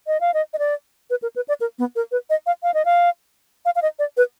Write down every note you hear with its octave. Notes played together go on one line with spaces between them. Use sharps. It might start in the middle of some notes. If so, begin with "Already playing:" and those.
D#5
F5
D#5
D#5
D5
B4
A#4
B4
D5
A#4
B3
A#4
B4
D#5
F5
F5
D#5
F5
F5
F5
D#5
D5
B4